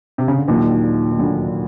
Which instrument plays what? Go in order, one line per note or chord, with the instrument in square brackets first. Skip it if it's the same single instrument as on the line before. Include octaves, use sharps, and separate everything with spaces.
[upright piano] C3
C#3
D3
[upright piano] D#2 D#3 [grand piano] A#2 F#3 A#3 D4 F4
[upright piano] D#3
[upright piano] D2 D3 [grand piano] A#2 F#3 A#3 D4 F4